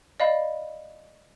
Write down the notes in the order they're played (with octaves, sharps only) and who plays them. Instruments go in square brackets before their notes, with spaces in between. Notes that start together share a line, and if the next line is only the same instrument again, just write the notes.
[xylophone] D5 D#5 F5 B5